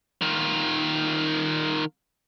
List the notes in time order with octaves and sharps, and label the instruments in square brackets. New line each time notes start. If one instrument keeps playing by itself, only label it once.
[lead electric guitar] D#3 F4